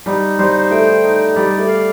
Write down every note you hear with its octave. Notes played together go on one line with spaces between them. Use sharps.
G3 D#4
G3 C5
A3 G5
D#4
G3 D5
A3
F5